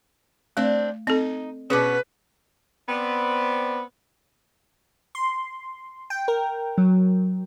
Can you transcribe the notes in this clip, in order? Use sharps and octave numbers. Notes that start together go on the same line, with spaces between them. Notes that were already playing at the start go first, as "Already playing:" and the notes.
A3 C4 D4
C4 D#4 A4
B2 B3 C#4 G#4 B4 D6
B3 C4 D5
C6
G5
A#4
F#3